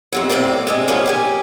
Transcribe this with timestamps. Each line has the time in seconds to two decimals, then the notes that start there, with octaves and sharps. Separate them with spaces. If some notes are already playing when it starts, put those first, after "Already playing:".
0.13 F2 C3 F#3
0.29 F2 A2 C3 C4 D5
0.67 C3 G#3 D4
0.88 A#2 C#3 F3 B3 C#4 D4
1.06 G4 G5 G#5